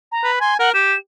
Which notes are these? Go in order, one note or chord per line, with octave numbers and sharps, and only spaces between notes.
A#5
B4
G#5 C6
A#4 F#5
G4 E7